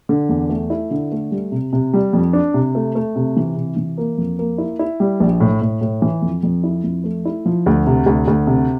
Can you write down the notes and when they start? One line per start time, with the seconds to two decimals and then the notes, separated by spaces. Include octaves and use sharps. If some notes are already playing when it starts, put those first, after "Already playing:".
0.09 D3
0.29 E2
0.49 A3
0.70 E4
0.91 D3
1.12 A3
1.31 G3
1.52 C3
1.73 C3
1.93 G3
2.13 F2
2.33 D4
2.54 C3
2.75 A3
2.95 A3
3.16 C3
3.37 E3
3.56 C3
3.77 E3
3.98 A#3
4.18 F2
4.39 A#3
4.58 E4
4.79 E4
5.00 G3
5.20 A#1
5.40 A2
5.61 A2
5.81 A2
6.02 E3
6.22 F2
6.43 F2
6.63 E4
6.84 F2
7.04 A3
7.25 E4
7.46 F3
7.66 D2
7.87 C3
8.06 D2
8.27 D2
8.47 C3